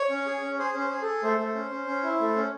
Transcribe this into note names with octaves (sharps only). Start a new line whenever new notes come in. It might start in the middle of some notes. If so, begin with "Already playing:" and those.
Already playing: C#5
C#4
G#4
C#4
G#4 C5
C#4
C5
G#4
G#4 A4
A3 C5
A3
C#4
C#4
C#4
E4
A3
C#4